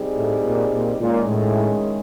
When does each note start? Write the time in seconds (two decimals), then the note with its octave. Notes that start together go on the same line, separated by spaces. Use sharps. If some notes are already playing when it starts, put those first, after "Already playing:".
Already playing: G3 C4 D#4 G#4
0.15 A2
0.44 A#2
0.71 A#2
1.00 A#2 D#3 G#3 C#4 E4 G#4
1.29 A2